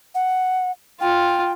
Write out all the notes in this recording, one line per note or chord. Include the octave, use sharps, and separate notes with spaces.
F#5
F4 G5